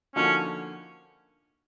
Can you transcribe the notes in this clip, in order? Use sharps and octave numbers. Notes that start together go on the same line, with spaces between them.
D3 F3 A#3 C#4 D#4 F#4